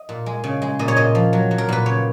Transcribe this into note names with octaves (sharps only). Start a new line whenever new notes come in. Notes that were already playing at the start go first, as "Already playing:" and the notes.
Already playing: D#5
A#2
G#3
C#3
G#3
A#2 D#5
C#5
A#2 D#5
F3
F#3
F#3
A#4
A#2 B4
C#3 C#5